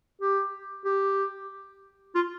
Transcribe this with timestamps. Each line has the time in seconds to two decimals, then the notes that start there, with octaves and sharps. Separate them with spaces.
0.21 G4
0.85 G4
2.15 F4